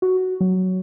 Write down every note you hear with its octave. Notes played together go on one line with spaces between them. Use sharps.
F#4
F#3